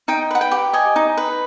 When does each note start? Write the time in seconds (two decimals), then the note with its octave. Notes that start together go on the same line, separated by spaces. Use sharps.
0.08 D#4 G5
0.31 B4 F#5
0.41 G5
0.51 G4
0.73 D#5 G#5
0.96 D#4
1.17 B4